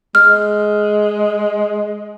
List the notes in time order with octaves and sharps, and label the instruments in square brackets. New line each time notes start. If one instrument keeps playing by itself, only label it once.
[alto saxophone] G#3 [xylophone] F6